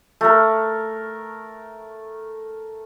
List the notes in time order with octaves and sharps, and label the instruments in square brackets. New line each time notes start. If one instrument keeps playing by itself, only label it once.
[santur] A3 A#4